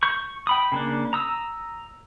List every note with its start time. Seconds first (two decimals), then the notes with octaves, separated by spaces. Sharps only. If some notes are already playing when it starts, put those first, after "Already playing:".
0.03 C#6 G6
0.47 G5 B5 D#6
0.72 C#3 A#3 D4
1.13 A#5 D#6 E6